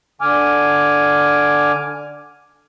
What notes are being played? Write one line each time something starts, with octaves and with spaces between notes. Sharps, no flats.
D3 G#5 D6 F6